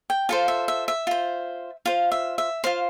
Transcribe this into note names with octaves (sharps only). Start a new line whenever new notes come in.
G5
F4 A4 C5 F5
E5
E5
E5
F4 C5
F4 C5 F5
E5
E5
F4 C5 F5